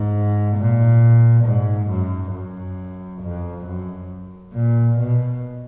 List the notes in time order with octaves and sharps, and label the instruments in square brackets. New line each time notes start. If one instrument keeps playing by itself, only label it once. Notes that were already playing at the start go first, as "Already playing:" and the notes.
Already playing: [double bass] G#2
A#2
G#2
F#2
F#2
F2
F#2
A#2
B2